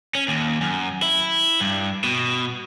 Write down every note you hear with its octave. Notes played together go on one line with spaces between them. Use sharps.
C#4
D#2
F#2
E4
G2
B2